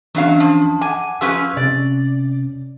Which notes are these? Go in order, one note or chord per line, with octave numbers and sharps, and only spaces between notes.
E2 E3 F#3 C#4 D4 F5
F3
F#5 G#5 D6
F3 C#4 G4 B4 F5 E6
C3 C#4 D5